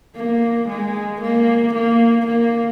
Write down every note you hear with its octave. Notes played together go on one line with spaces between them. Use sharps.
A#3
G#3
A#3
A#3
A#3